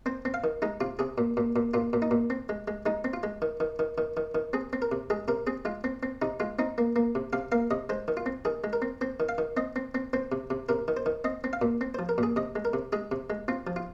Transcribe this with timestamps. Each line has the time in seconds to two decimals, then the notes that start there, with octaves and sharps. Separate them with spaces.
0.06 C4 C5
0.25 C4
0.34 F5
0.44 D#3
0.62 G#3 D#4
0.81 C3 F4
0.99 C3 G#4
1.18 A#2
1.37 A#2
1.56 A#2
1.74 A#2 F4
1.93 A#2
2.02 D#4
2.11 A#2
2.30 C4
2.49 G#3
2.68 G#3
2.86 G#3 D#4
3.04 C4
3.13 F4
3.23 G#3
3.42 D#3
3.60 D#3
3.79 D#3
3.98 D#3
4.17 D#3
4.35 D#3
4.53 C4 G#4
4.73 C4
4.82 A#4
4.92 C3
5.10 G#3 G#4
5.28 C3 A#4
5.47 C4 G#4
5.65 G#3 F4
5.84 C4
6.03 C4
6.22 C3 D#4
6.40 G#3 F4
6.59 C4 D#4
6.78 A#3
6.96 A#3
7.15 C3
7.33 C3 F5
7.52 A#3 F5
7.71 C3 D#5
7.89 G#3 C5
8.08 D#3
8.17 F4
8.26 C4
8.45 D#3 G#4
8.64 G#3
8.73 A#4
8.82 C4
9.01 C4 C5
9.20 D#3
9.29 F5
9.38 D#3
9.57 C4 D#5
9.76 C4
9.95 C4
10.13 C4 C5
10.32 C3
10.50 C3
10.69 C3 A#4
10.88 D#3
10.97 C5
11.06 D#3
11.24 C4 D#5
11.44 C4
11.53 F5
11.62 A#2
11.81 C4
11.94 F3 C5
12.09 A#4
12.18 A#2
12.23 G#4
12.36 C3 D#5
12.56 G#3
12.65 A#4
12.73 C3
12.92 G#3 G#4
13.11 C3
13.30 G#3
13.48 C4 F4
13.67 F3
13.76 F4